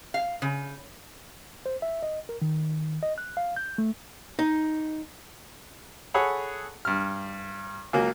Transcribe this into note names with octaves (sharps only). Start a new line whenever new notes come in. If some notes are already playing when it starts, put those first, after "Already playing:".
F5
C#3
C5
E5
D#5
A#4
D#3
D#5
F#6
F5
G6
A3
D#4
G#4 A4 C#5 F#5 B5
G2 F6
C#2 F#3 A#3